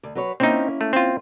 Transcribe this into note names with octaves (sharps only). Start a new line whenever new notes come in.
D2
F#3 B4 C#5
A#3 C4 C#4 D#4 E4
A3
C4 F4